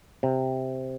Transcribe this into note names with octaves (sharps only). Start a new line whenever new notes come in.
C3